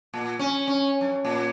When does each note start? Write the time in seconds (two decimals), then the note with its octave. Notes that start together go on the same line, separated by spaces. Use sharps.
0.14 A#2
0.39 C#4
0.68 C#4
1.01 F#2
1.25 A#2